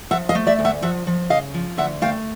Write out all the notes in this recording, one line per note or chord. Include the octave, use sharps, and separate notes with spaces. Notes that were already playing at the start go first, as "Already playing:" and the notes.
F3 E5 F#5
D#5 F5
A3
D5 E5
D2
E5 F#5
F3 E5 F#5
F3
C#3 D#5 F5
F3
D2 E5 F#5
A3 F5 G5